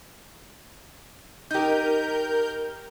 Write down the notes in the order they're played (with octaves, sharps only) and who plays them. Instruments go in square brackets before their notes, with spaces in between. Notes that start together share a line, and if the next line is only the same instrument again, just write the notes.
[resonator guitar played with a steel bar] D#4 G4 [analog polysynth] A#4 G6